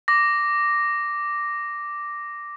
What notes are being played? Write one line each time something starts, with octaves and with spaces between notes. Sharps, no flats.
D6 A#6